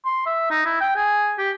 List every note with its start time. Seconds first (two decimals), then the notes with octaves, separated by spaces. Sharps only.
0.05 C6
0.26 E5
0.50 D#4
0.65 E4
0.81 G5
0.96 G#4
1.38 G4